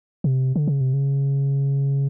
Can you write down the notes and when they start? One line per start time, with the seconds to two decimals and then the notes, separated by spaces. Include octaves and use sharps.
0.24 C3
0.56 D3
0.68 C#3
0.81 C3
0.93 C#3